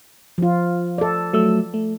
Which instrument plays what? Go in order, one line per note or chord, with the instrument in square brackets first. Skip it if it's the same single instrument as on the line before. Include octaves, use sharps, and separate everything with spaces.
[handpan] F3 F4
A4 D5
[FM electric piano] F#3 A3 E6
A3